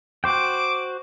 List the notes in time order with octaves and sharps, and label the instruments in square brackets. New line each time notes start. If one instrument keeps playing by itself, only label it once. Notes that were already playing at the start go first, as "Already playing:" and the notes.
[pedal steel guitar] F#4 C5 G5 [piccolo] D6